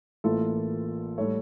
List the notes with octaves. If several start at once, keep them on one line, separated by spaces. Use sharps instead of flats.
A1 A2 E3 A#3 F4 A4
A2 G3 A4 C#5